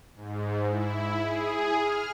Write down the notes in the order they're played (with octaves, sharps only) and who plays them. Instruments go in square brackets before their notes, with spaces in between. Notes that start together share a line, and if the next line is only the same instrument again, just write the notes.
[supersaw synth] G#2
E4
G#4
F6